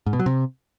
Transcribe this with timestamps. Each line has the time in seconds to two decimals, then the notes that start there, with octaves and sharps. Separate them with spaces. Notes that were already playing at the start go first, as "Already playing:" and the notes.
0.06 G#2
0.13 B2
0.20 F#3
0.26 C3